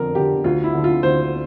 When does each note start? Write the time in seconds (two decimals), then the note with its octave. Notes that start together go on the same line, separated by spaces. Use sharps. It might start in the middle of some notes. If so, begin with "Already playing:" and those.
Already playing: F2 D3 A#4
0.15 D3 G4
0.44 D2 F4
0.64 E4
0.74 D3
0.84 F4
1.03 D2 C5